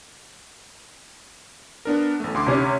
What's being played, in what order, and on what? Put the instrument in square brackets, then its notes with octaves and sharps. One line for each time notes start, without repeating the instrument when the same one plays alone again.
[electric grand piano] B3 D4 A#4
A1 A3
D2 C6 D6
[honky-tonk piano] C3 C#4